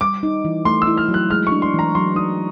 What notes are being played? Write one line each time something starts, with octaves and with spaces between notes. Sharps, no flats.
G3 D6
D#4
E3
A3 C6
E6
E4
F6
F#3
F#6
G#3 F6
C#6
D4
C6
E3 A#5
F#3 C6
D#4 D#6